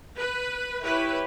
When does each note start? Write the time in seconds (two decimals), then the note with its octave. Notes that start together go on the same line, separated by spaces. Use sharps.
0.18 B4
0.82 E4 G4 B4 C#5